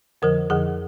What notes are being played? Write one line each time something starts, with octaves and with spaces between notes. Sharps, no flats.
F2 D3 F3 A#4
F2 D3 F3 G#4